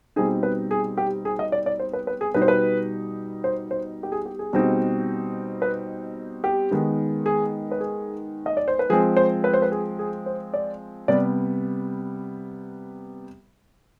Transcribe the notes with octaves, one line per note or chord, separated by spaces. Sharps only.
B2 G3 C4 D#4 G#4
B4
G#4
G4
G#4
D#5
D5
D5
C5
B4
B4
G#4
B2 G3 B3 D#4 B4
C5
B4
C5
C5
G4
G#4
G4
G#4
B2 G3 C4 D#4
B4
G4
D#3 G#3 B3 D#4
G#4
B4
G#4
D#5
D5
C5
B4
F3 G#3 C4 G#4
C5
B4
C5
B4
G#4
G#4
C5
D5
C3 G3 B3 D5